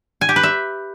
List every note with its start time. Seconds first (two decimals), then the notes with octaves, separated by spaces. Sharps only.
0.21 G#5
0.29 G4
0.36 B4
0.43 E5